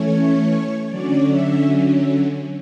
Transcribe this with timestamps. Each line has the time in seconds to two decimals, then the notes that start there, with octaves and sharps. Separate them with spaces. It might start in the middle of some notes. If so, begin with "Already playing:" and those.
Already playing: E3 A3 C#4 C#5
0.88 D3 F#3 C#4 D5
1.28 E5